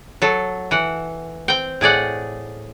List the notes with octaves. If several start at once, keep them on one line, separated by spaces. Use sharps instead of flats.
F#3 A4
E3 F#5
C4 G5
A2 G#4 D5 F#5